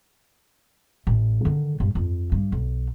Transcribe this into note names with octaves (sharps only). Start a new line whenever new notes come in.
A1
D3 D#3
G2
F2
G2
B1